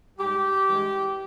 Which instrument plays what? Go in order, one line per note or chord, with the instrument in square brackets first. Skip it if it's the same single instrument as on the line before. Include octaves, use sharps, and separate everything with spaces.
[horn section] G#2 G3 G4
G2 E3 G#3